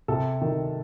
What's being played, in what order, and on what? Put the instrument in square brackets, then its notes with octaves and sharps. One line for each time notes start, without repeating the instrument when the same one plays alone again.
[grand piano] C3 A4
D#3